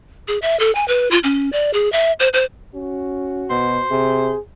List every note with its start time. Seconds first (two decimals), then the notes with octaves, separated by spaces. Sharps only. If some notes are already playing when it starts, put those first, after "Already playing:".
0.28 G#4
0.42 E5
0.60 A4
0.75 G#5
0.88 B4
1.11 F4
1.24 C#4
1.53 D5
1.74 G#4
1.92 E5
2.20 C5
2.33 C5
2.75 C#4 F#4
3.50 B2 C5
3.91 C3 G#4